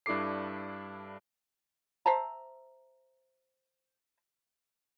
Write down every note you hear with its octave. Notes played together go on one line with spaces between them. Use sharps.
G2 D4 E4 A4 D6 C7
C5 E5 A5 A#5